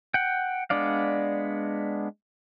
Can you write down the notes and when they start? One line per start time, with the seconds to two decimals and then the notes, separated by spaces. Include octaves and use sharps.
0.14 F#5 G5
0.70 G#3 B3 D4 D5 F5